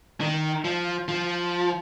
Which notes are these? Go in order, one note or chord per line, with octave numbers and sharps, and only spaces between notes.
D#3
F3
F3